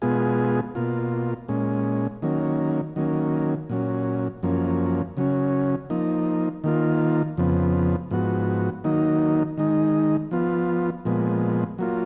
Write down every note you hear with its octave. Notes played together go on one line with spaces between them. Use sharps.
B2 G#3 B3 F4 G#4
B2 A#3 F4
A#2 G#3 C#4
D#3 F#3 A#3 C#4
D#3 F#3 A#3 C#4
A#2 F#3 C#4
F#2 F3 A#3 C#4
C#3 F#3 C#4
F3 A#3 D#4
D#3 A#3 F4
F2 C#3 F3 B3
G#2 F3 B3 F#4
D#3 F#3 A#3 D#4
D#3 G#3 D#4
F3 B3 F4
A#2 F3 G#3 B3
F#3 A#3 F4